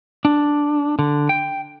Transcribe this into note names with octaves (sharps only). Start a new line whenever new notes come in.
D4
D3
G5